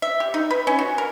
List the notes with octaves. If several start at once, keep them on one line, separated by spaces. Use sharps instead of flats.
E5
G4
D#4
B4
C#4
F#4
A#4